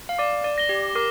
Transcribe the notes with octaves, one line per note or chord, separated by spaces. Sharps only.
F5
D5 D6
D5
A#6 G7
G4
A#4 D6